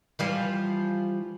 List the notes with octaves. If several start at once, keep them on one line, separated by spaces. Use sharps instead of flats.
E3 F3 G3